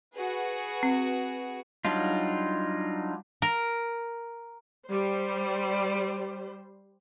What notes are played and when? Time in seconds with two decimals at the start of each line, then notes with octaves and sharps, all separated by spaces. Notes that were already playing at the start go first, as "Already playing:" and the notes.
0.13 F#4 G#4 B4
0.83 C4
1.85 F#3 G3 D4 D#4 F4
3.42 A#4
4.87 G3 C5